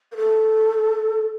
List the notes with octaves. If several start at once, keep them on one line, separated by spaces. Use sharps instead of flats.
A#4
A4